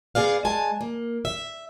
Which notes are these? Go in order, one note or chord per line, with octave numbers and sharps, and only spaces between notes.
B3 G#4 D5 F5
G#3 G#5 A5
A#3
E5